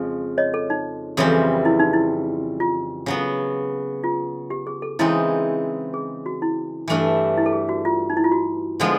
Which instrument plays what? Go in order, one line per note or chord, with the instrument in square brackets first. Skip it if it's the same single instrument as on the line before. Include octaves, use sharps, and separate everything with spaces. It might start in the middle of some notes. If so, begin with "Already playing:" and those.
Already playing: [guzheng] F2 C#3 F3 G#3
[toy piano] C#5 D#5
A4
D#4
[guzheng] F2 C#3 E3 G3 C4
[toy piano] E4
D#4
E4
F4
[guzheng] C#3 F#3 B3
[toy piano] F4
G4
G#4
A4
[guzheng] C#3 E3 G#3 C4 D#4 [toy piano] E4
[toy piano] G#4
F#4
E4
[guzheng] G2 E3 A3 D4
[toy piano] E4
A4
G#4
F#4
F4
D#4
E4
F4
F#4
[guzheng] D3 F3 G#3 B3